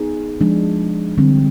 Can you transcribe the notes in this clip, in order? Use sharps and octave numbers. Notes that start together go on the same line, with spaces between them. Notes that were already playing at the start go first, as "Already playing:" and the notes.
Already playing: B3 D#4 G#4
F3 G#3 D4
D3 G3 C4